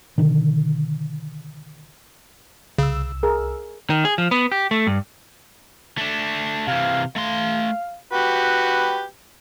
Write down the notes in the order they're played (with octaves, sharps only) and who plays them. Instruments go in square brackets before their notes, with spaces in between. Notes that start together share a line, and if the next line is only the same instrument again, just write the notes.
[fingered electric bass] B2 D3 D#3
[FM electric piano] C2 E6 [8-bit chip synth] C#3
[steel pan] G#4 A#4
[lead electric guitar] D#3
G#4
F3
B3
G4
A3
G2
[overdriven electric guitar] A3 D4
[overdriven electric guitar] C3 E3 [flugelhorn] F5
[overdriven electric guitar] A3 C6 [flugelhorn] F5
[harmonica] F#4 G4 B4